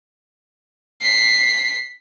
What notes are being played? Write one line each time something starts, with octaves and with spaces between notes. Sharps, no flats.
B6 C7